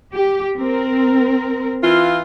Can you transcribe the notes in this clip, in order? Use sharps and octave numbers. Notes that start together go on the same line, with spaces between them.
G4
C4 A#4
E3 F4